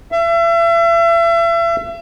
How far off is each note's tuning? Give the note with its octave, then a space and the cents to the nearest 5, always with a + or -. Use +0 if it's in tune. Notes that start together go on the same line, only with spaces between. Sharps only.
E5 +35